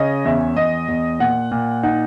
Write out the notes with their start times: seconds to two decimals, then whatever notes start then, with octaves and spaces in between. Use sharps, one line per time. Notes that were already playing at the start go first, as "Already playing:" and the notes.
Already playing: C#3 C#4 D#5
0.25 E2 E5
0.56 E2 D#5
0.88 E2
1.20 A#2 F#5
1.52 A#2
1.83 D#4 F#5